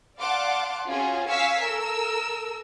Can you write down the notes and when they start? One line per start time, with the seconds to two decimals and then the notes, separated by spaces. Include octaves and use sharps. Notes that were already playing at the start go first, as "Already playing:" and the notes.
0.19 D5 F5 F#5 A5 C6 D6
0.87 C#4 F4 F#4 G#4
1.30 F5 G#5 C#6 E6 B6
1.63 A4 A#4 E6